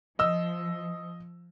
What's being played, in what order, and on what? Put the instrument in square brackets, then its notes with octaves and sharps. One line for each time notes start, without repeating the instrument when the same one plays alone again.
[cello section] F3 [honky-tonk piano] D#5 E6